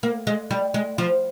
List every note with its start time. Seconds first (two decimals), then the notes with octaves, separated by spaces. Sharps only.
0.03 A#3
0.27 G#3
0.51 G3
0.74 G#3
0.98 F3